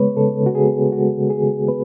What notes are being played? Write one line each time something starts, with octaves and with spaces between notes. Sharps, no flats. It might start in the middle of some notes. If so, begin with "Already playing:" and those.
Already playing: C#3 G#3 B3 B4 C#5
C#3 A4
C#3 F#4
G#4
B3
G#3 F#4
C#3
G#4
C#3
B3 B4